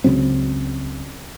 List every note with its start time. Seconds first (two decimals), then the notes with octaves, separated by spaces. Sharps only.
0.04 C#2 C#3 F#3 C4